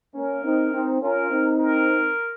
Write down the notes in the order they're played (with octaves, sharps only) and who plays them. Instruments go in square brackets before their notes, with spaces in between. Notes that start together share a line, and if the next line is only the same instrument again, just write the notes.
[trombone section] A#3 C#4 [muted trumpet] A#4
[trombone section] C4 D#4
C4 D#4
[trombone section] C#4 F4 [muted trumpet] A#4
[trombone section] C4 D#4
[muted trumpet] A#4